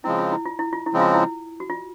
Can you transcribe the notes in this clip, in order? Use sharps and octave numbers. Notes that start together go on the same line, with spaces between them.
C#3 F3 G#3 C4 E4
F4
E4
F4
E4
F4
E4
C#3 F3 G#3 C4
F4
E4
F#4
F4